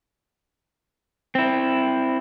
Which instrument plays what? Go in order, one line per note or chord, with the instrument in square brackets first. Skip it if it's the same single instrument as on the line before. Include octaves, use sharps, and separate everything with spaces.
[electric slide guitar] C4 E4